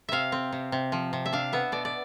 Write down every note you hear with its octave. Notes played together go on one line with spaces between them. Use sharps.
C3 E5 F5
C4
C3
C3
F3
C3
E5
D4 F5
B3 E5
B2 D5
D5